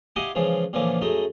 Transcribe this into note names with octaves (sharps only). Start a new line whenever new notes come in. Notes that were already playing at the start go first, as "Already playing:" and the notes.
E4 G4 D#5 F5 F#5 G#5
C#3 E3 F3 G#3
A#2 D3 E3 F3 A#3 C#4
F#2 G#3 A3 D#4